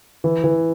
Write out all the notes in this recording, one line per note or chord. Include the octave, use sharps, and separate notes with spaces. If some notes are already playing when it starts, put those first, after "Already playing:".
E3
E3